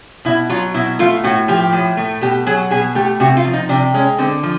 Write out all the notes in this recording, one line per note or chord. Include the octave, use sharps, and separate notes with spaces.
B2 E4
F#3 F4
B2 E4
A3 F4
A2 F#4
F3 G4
A2
A3
B2 G4
F#3 G#4
B2 G#4
A3 G4
C3 F#4
F4
F3
D#4
C3 D4
G#3 C#4
D3 C4
F3